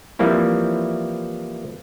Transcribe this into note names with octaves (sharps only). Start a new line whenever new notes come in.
E3 F3 G3 A#3 C4 E4